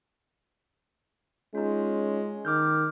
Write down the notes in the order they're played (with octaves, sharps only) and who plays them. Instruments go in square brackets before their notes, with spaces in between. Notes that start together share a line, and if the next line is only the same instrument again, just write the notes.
[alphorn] G#3 [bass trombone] C#4 [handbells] D#4 F4
[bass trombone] D#3 [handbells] D6 F6 G6